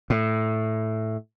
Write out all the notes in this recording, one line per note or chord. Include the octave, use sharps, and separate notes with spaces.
A2